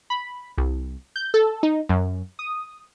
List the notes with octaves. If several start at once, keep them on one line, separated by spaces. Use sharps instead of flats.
B5
C2
G6
A4
D#4
F#2
D#6